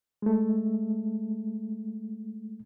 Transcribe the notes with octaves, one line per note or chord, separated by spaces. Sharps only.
G#3 A3